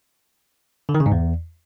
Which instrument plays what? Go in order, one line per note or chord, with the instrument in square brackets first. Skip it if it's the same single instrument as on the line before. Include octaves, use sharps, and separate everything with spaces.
[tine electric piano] D3
D#3
C#3
G#2
E2